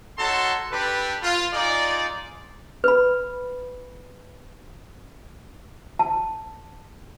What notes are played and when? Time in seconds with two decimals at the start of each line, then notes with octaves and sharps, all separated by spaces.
0.18 D#4 F#4 A4 C#5 A5 C6
0.71 D4 G4 A4 B4
1.22 F4
1.53 D#4 F4 G#4 D5
2.84 B4 B5
5.99 A5